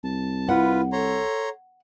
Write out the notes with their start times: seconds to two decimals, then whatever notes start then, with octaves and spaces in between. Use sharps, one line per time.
0.04 C2 A5
0.49 E4 F4 B4 F#5
0.92 A4 C#5 A#5 C6